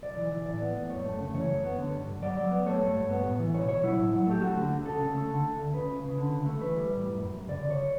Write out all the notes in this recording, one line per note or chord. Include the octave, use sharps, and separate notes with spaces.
B1 D5
E3
E3
A2 D5
B3
A2
F#2 C#5
A3
C#3
E3 C#5
F#2
B3
D3
G2
G2
F#3 D5
F#3
B3
A3 C#5
G2
G2
B3
A2
E3
B2 C#5
B2 C#5
F#3 E4
A2
F#3
A3 G4
A3 F#4
D3
D2
C#3 A4
C#3
A3
D3
D2
D2
C#3 B4
C#2
C#3
D3
D2
A3
E3 B4
G3
A2
F#2
F#2
F#2
C#3 D5
D2
C#5